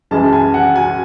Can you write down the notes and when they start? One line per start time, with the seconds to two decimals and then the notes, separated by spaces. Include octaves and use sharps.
0.11 F#2 E3 G#3 A5
0.33 G#5
0.54 F#5
0.76 G#5